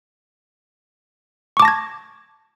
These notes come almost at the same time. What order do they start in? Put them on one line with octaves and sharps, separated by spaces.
C#6 D6 A5 A#6 G#6